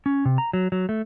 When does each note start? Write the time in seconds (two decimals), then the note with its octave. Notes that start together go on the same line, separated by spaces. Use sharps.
0.06 C#4
0.25 C3
0.38 A#5
0.53 F#3
0.72 F#3
0.89 A3